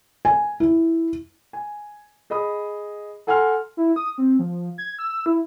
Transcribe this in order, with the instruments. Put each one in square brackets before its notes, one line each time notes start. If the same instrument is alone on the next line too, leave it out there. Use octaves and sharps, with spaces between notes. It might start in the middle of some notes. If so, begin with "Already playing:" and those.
[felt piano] G#5
E4
[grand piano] G#5
G#4 D#5 B5 D#6
A4 F#5 G#5 A#5 C6 F6
[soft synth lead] E4
D#6
C4
F3
G#6
E6
E4